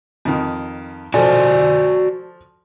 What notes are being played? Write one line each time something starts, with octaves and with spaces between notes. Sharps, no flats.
F2 D#3
F3 F#4 A4 D5 G#5